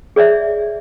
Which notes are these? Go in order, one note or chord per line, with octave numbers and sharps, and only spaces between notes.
G#4 C#5 D5 E5